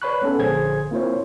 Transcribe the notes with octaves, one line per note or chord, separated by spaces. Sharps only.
B4 C#5 D5 B5 C#6 F#6
G#3 B3 C#4 A4
A#1 D3 G#4 C5 G#6
A#3 C4 E4 F4 C5 C#5